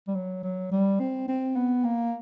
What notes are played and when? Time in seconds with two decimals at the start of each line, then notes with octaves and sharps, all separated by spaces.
0.08 G3
0.15 F#3
0.43 F#3
0.71 G3
1.00 C4
1.28 C4
1.56 B3
1.85 A#3